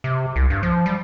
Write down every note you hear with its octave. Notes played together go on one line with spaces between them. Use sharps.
C3
C2
G2
F3
G3